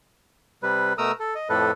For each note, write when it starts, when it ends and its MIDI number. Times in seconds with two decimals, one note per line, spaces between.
0.63 0.93 48
0.63 0.93 55
0.63 0.93 71
0.98 1.12 47
0.98 1.12 57
0.98 1.12 70
0.98 1.12 82
0.98 1.12 87
0.98 1.12 88
1.20 1.34 69
1.35 1.48 75
1.49 1.71 41
1.49 1.71 45
1.49 1.71 53
1.49 1.71 69
1.49 1.71 71